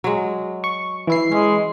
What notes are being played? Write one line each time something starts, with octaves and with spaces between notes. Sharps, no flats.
F#3 G#3
C#6
E3 E4 C7
G#3 C#4